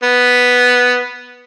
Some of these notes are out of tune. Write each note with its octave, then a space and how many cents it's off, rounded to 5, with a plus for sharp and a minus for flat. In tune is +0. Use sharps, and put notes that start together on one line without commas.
B3 +0